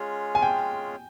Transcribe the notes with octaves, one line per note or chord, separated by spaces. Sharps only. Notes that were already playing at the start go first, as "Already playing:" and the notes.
Already playing: G#3 C#4 F4 G#4 C#5
G#5
G5